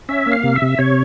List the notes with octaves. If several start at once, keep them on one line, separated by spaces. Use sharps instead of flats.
C#4 E5
A#3
F5
C3
E5
C3
C3 C#5